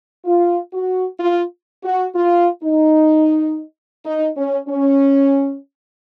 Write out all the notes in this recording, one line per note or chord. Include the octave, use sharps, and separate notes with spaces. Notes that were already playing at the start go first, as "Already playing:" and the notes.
F4
F#4
F4
F#4
F4
D#4
D#4
C#4
C#4